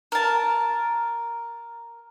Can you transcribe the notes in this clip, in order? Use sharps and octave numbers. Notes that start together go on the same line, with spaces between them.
A#4 A5